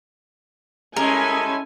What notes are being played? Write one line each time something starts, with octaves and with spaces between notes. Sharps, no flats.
G3 G#3 C#4 E4 A4 A#4 G#5